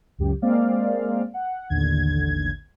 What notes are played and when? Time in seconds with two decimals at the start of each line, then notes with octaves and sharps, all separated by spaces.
0.18 C#2 F#2 G4
0.42 G#3 A#3 C4 D5 F5
1.34 F#5
1.70 A1 D#2 D3 G#6